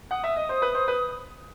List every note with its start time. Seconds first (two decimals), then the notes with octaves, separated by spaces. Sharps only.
0.11 F#5 D#6
0.24 E5
0.36 D#5
0.49 C5
0.62 B4
0.75 C5
0.88 B4